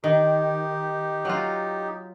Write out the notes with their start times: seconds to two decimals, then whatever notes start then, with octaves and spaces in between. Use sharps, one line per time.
0.04 D#3 D#4 G4
1.25 F#3 F4